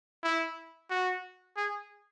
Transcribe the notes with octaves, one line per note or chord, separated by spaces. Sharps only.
E4
F#4
G#4